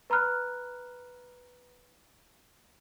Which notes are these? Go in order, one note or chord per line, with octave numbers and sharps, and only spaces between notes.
B4 A#5 B5 F6 F#6